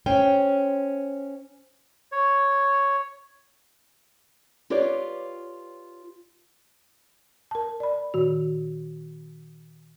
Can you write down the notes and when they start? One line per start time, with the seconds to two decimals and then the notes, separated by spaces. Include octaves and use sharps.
0.06 C#4 C5 G5
2.12 C#5
4.70 F4 G4 B4 C#5 D5
7.51 A#4 A5
7.80 D5 B5
8.14 A#2 D#3 F#4